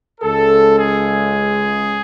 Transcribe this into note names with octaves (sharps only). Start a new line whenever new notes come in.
C#2 C#3 G#3 A4
G#4